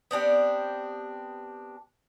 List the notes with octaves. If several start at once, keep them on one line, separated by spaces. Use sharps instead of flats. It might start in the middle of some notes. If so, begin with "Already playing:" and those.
B3 C4 D4 G4